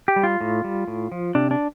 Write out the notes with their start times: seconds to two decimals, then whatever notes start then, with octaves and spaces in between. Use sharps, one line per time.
0.08 G4
0.16 G3
0.24 F4
0.41 A2
0.64 G3
0.88 A2
1.12 F3
1.35 C3 D4
1.51 D4